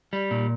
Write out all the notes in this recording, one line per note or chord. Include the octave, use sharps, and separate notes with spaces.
G3
A#2